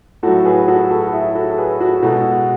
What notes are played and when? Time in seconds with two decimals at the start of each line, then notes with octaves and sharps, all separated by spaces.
0.23 A2 F#3 F#4 A4
0.45 G#4 B4
0.68 F#4 A4
0.91 F#4 A4
1.07 A4
1.12 E4 G#4
1.35 F#4 A4
1.51 A4
1.58 G#4 B4
1.80 F#4 A4
2.03 B2 G#3 F#4 A4